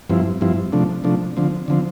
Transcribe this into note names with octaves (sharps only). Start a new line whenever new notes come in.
G2 F3 C4 E4
G2 F3 C4 E4
C3 F3 A3 D4
C3 F3 A3 D4
D3 F3 C4
D3 F3 C4